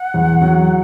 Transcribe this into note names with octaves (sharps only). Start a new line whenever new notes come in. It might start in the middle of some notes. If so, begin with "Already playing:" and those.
Already playing: F#5
E2
F#3